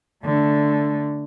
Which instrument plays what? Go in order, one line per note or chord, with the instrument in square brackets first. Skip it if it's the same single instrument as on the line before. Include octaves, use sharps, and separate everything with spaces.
[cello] D3 A3